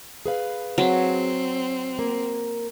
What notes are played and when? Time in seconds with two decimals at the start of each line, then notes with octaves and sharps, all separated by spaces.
0.26 G#4 B4 F5
0.78 F#3 C4
1.99 A#3